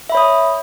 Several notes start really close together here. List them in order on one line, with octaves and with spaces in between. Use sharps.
E5 B5 C#5 D#6